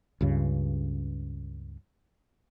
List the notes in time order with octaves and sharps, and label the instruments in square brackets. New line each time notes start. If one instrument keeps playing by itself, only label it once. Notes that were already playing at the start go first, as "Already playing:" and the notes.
[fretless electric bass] C#2 G2 C#3